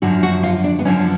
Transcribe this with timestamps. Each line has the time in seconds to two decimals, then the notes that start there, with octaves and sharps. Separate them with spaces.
0.02 F#2 D3 F3 F#4
0.23 F#4
0.43 F4
0.64 D4
0.79 B3
0.85 F#2 D3 F3 C#4